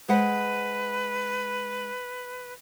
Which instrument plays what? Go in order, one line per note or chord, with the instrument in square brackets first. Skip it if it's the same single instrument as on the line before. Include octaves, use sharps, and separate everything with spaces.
[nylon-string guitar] G#3 C5 F#5 [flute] B4